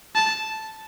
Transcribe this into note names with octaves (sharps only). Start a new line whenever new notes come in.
A5